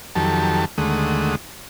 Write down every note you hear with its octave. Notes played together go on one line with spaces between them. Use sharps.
F2 D#3 F#3 G4 A4 A5
D#2 D3 G#3 A3 F#5 D#6